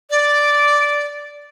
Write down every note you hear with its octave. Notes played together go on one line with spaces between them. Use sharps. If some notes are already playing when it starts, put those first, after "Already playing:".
D5